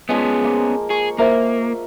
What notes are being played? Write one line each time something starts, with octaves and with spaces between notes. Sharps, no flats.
F3 G#3 B3 C#4
A#3 C6
G#4 C#6
A#3 A#4 C5 E5